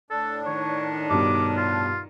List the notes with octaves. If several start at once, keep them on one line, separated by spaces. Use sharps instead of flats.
A2 D4 A4
D#3 C#5
G2 B2 D6
F4